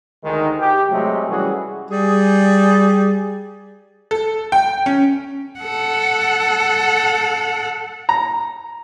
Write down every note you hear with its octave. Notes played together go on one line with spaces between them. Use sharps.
D2 D#3 G#3
G4
C3 F#3 G#3 A3
E3 G3 A3 C#4 F#4 G#4
G3 G#4
A4
G5
C#4
A4 F#5
A#5